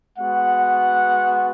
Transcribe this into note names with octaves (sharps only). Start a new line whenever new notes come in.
G#3 B3 F#4 F#5